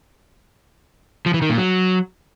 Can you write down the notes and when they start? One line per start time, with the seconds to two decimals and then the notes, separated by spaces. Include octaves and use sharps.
1.26 F3
1.34 E3
1.42 D#3
1.50 A#2
1.57 F#3